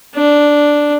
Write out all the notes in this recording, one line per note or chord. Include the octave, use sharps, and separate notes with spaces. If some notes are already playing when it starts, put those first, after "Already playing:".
D4